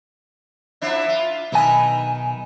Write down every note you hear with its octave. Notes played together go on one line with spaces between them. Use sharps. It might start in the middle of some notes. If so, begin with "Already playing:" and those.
F3 D4 E4
F4
B1 D#3 B4 D#5 G#5